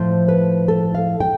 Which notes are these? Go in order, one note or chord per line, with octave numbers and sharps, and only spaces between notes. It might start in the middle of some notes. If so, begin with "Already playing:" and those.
Already playing: A2 F3 C5
B4
A4
F5
G5